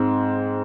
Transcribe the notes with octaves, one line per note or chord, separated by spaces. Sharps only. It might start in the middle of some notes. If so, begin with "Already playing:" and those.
Already playing: G#2 G#3 C4